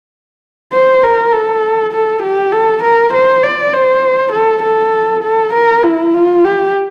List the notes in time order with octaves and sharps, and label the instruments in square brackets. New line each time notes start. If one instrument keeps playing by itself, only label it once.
[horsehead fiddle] C5
A#4
A4
A4
G4
A4
A#4
C5
D5
C5
A4
A4
A4
A#4
E4
F4
G4